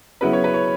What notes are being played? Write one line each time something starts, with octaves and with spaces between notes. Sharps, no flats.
C#3 F#3 B3 E4 B4
C#5
B4
C#5